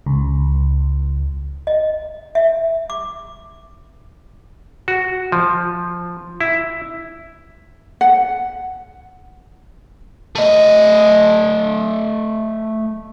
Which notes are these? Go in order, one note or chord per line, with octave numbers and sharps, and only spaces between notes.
C#2
D#5
E5
D6
F#4
F3
E4
F#5
A3 D#5